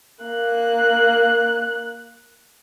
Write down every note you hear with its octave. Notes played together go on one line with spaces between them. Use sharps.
A#3 F#6